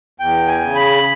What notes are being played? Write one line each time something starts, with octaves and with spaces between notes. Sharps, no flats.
E2 G5
G#5
C#3
B5